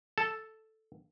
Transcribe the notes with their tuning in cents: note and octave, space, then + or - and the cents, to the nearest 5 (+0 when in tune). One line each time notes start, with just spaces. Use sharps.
A4 +0 A5 +0